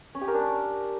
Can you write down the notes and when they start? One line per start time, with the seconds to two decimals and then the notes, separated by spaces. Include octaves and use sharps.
0.15 C#4
0.21 G4
0.28 A#4
0.34 D4